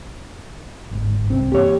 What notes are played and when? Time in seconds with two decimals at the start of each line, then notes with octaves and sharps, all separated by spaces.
0.91 G1 G#2
1.30 C2 C4
1.52 G2 E3 A#3 G4 C#5